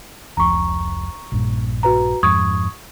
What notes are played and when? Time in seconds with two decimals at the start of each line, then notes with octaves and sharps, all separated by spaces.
0.37 F1 C#2 F3 A#5 C#6
1.32 A#1 G2 A#2
1.83 F#4 B4 A#5
2.23 F2 G#2 C#6 D#6 G#6